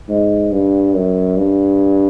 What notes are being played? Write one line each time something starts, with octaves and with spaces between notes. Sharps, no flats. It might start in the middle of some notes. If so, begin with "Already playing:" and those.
G#2
G2
F#2
G2